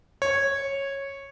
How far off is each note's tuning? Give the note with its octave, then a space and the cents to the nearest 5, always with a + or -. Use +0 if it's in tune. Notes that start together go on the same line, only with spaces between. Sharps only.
C#5 -10